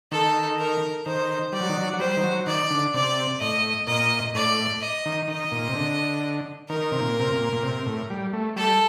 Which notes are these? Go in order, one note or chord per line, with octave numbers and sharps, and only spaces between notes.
D#3 A4
A#4
D#3 C5
G3 D5
F#3
D#3
F#3
F#3
G3 C5
D#3
F#3
D#3 D5
D3
C3 D5
A2 D#5
A#2 D#5
A2 D5
D#5
D#3
D#3 D#5
A#2
C3
D3
D#3 A#4
C3
A#2
C3
A#2
A#2
C3
A2
G3
A3
G3 A4